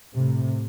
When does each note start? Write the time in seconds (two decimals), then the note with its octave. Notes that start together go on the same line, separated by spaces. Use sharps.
0.14 A2 C3